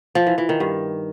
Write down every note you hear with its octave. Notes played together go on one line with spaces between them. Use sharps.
F3
E3
E3
D#3
G2